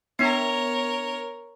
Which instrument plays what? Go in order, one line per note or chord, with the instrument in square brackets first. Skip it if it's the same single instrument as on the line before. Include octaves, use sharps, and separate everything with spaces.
[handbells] B3 D4 [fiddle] A#4 C#5